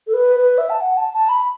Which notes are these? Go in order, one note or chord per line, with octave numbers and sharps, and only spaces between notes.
A4
B4
B4
E5
A5
F#5
A5
A5
B5